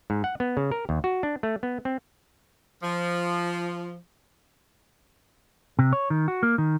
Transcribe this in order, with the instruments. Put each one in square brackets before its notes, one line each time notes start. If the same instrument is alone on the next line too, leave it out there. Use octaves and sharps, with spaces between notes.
[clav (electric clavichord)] G#2
F#5
B3
C#3
A#4
D#2
F#4
D4
A3
B3
C4
[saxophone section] F3
[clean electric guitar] C3
C#5
D#3
F#4
A#3
D#3